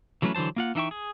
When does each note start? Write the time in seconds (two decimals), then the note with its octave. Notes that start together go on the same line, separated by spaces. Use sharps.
0.22 E3 F#3 A3 C#4 B4
0.35 D3 E3 F#3 C5 A5
0.56 A#3 F4 F#5
0.75 E3 D#4 E5 G5 C#6
0.91 G#4